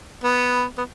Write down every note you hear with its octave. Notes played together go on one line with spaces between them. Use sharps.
B3
B3